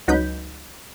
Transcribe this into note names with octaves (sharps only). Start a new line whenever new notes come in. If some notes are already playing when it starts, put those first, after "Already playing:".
C#2 F#3 D#4 B4 B5 G6